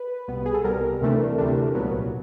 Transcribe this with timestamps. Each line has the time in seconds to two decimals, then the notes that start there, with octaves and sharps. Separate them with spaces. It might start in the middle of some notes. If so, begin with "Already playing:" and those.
Already playing: B4
0.28 C2 B2 G3 B3
0.46 G#4
0.54 A4
0.64 C2 B2 G3 B3 A#4
1.01 D2 C3 E3 A3 D4
1.38 D2 C3 E3 A3 D4
1.75 C2 A#2 F#3 B3